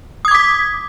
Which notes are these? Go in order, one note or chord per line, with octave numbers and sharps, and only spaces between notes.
D6 D#6 G#6 B6